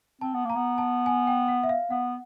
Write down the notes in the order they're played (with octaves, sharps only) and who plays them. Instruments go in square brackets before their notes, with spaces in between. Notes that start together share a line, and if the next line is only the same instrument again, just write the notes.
[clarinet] C4 [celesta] A5
[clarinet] B3
[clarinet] A#3 [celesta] A#5
[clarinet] B3
[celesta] A5
G#5
G5
F#5
E5
F5
[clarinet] B3 [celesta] F#5